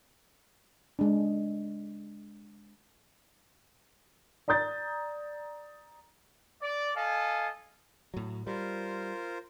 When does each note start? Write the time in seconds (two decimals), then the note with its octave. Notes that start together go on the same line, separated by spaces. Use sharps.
0.99 G#3 D4
4.48 D5 A#5 D#6 G6 A6
6.62 D5
6.96 A4 D#5 F5 G#5
8.14 A2 F#3
8.47 G3 F4 A#4 C5